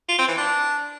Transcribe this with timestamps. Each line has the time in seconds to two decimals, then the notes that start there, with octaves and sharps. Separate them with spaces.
0.09 F4
0.18 C4
0.28 E3
0.38 D4